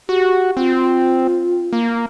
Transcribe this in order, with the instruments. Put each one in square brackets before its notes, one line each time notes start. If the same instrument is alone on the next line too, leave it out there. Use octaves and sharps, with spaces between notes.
[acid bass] F#4 [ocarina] G4
[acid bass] C4 [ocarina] F4
[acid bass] A#3